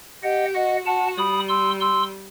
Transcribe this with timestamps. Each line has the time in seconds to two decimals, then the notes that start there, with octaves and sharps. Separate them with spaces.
0.23 G4 D#5 F#5
0.55 F#4 D#5 F#5
0.86 F#4 F#5 A5
1.18 G3 B5 D#6
1.49 C6 E6
1.81 C6 E6